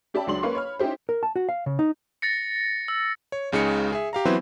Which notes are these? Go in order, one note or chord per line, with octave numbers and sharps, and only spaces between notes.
C#4 G4 D5 E5 A5 B5
C#2 F#3 D4 C6 F#7
A#3 C#4 B4 F5 C6 C#6
C#5 B5 F6
C#4 D#4 E4 G4 C5
A#4
A5
F#4
F5
C#3
D#4
A6 A#6 C#7
E6
C#5
C#2 C#3 G#3 D#4 C#7
G#4 E5
G4 F5 A#5
E3 F#3 B3 C4 E4 C5